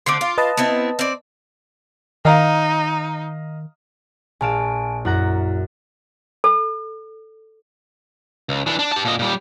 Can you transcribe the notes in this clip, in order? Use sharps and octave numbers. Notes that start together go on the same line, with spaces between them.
D3 A3 C4 C6 D6
F4
B4 D#5 A5
B3 C4 E4
C4 D5
D#3 D#4 D#5 F5 A#5
A#1 F5 G#5 A5 D7 E7
F#2 E4 F#5 A#5
A4
C#2
E3 D4
D4
G4 A5
A#2 D#5
A#2 G3